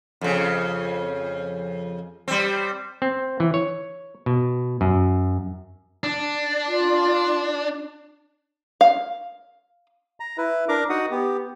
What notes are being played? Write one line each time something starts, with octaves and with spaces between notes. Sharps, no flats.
F2 C#3
G3 C4
C4
E3
C#5
B2
F#2
D4
F4
F5
A#5
E4 B4
D4 A#4 A#5 D6
D#4 F#4 F#5 D#6
B3 G4